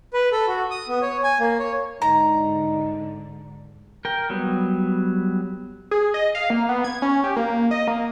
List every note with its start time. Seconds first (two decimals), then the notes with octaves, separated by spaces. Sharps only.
0.13 B4
0.32 A4
0.47 F#4
0.71 D#6
0.88 B3
1.02 C#5
1.24 G#5
1.40 A#3
1.59 C#5
2.02 G#2 D3 D#4 A#5
4.05 A#4 G5
4.30 F#3 G3 B3
5.91 G#4
6.14 D#5
6.35 F5
6.50 A#3
6.69 B3
6.84 G#6
7.02 C#4
7.24 G4
7.36 A#3
7.71 D#5
7.87 A#3